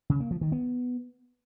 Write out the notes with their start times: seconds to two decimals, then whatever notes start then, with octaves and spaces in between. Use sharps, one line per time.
0.10 C#3
0.20 A#3
0.31 F3
0.41 D#3
0.52 B3